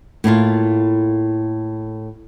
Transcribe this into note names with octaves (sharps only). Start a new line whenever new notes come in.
A2 A#3 E4 F4